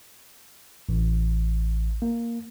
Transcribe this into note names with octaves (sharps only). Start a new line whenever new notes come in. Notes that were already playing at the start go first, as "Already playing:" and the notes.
A1
A#3